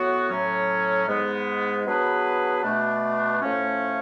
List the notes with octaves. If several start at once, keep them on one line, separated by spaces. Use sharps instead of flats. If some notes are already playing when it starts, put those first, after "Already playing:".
Already playing: A2 F#3 B3 F#4
A2 F#3 C#4
G#2 G#3 B3
F#3 B3 D4 G#4 B4
B2 A3 D4
A2 F3 A3 C#4